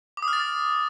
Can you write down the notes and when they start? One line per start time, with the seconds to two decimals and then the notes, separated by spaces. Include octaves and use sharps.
0.17 D6
0.22 D#6
0.28 F6
0.33 A6